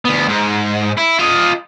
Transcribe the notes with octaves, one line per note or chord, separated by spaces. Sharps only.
D2 B3
G#2
E4
F4 D#5